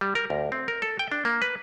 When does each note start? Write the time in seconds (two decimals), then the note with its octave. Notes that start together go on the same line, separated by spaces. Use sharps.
0.01 G3
0.15 A#4
0.30 D2
0.52 C4
0.68 A#4
0.82 A4
0.99 G5
1.12 D4
1.25 A#3
1.42 B4